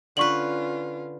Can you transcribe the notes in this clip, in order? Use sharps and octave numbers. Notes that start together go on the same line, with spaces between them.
D3 C#4 F4 B4 C#6 F#7